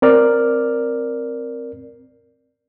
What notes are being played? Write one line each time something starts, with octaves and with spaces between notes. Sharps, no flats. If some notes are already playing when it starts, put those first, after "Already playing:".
C4 A#4 D5 F6